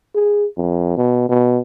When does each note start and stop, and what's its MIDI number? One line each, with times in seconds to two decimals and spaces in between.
0.15 0.46 68
0.57 0.93 41
0.97 1.28 47
1.29 1.60 47